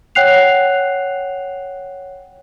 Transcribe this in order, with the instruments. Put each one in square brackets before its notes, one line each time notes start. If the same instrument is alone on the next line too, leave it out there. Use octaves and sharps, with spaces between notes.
[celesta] C#5 F#5 G5 F#6 C7 F7